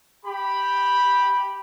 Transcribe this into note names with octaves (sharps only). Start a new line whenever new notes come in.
G4 B5